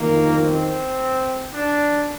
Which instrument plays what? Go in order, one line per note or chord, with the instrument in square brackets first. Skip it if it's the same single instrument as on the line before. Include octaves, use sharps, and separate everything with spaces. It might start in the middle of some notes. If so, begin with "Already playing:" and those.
Already playing: [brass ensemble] G1 F2 D#3 [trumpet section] A#3
[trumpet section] C4
D4